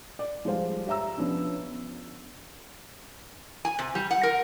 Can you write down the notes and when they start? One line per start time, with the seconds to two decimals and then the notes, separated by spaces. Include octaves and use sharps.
0.19 D5
0.45 F3 G3 G#3 C5 F5
0.87 G4 C#5 E5 A#5 E6
1.18 F3 B3 C#4 D4
3.65 G#5
3.79 C3
3.95 G3
4.11 F#5
4.23 A#4